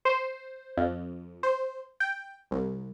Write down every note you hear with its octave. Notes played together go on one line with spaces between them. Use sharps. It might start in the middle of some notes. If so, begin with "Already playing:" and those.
C5
F2
C5
G5
C2